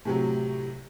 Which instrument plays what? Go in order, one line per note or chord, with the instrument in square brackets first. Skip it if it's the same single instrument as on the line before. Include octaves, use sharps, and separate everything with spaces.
[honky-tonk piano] A2 C3 F#3